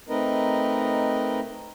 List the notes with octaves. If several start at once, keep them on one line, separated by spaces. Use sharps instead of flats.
A3 C4 D#4 A#4 B4 D#5